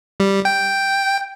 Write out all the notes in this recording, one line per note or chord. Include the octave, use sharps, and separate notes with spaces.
G3
G5